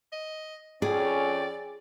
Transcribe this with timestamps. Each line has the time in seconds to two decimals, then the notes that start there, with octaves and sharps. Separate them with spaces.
0.12 D#5
0.82 F2 C#4 G#4 D5 G5